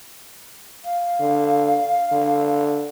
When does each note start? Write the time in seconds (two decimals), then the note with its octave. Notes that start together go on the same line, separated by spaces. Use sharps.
0.85 F5
1.20 D3
2.12 D3